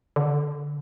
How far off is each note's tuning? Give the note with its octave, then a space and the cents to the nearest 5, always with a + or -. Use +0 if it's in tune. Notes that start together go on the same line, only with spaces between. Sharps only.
D3 -5